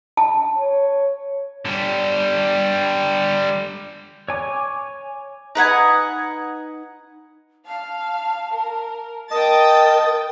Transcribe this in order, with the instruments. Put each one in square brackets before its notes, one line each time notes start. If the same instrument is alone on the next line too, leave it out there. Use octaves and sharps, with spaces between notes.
[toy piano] A5
[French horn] C#5
[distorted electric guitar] D3 G3
[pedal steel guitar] C#5 G#5 D6
[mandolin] D#4 B4 F#5 G#5
[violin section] F5 [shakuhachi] A5
[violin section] A#4
[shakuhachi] A#4 [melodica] D#5 A5 [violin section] G5 D#6 A6